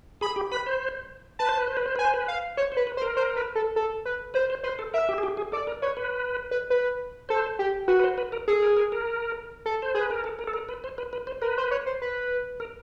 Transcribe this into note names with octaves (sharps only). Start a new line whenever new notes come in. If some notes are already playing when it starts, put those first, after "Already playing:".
G#4 B5
G4
B4 B5
C5
B4 A5
C5
B4
C5
B4
C5
B4 G#5
C5
B4
F5
C5 C#5
C5
B4
B4
C5
A#4
C5
B4
A4
A4
B4
B4 C5
C5
B4 C5
A4
A#4 E5
G4
G#4
G4
G#4
A4 D5
A#4
B4 C#5
B4
B4
B4
A4 C5
G4
F#4 B4
B4
C5
B4
A#4
G#4 A4
A#4
A#4
A#4
A4
C5
G#4 B4
A#4
A4
A#4
A4
A#4
B4
C5
B4
B4
C5
A#4 B4
C5
C#5
C5
B4
A#4